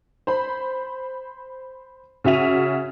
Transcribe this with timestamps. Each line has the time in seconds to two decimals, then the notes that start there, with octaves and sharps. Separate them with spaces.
0.27 C5 B5
2.24 C#3 F#4 E5 D#7 F7